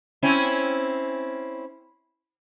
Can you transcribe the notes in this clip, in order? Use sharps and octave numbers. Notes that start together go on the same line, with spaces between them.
C4 C#4 E4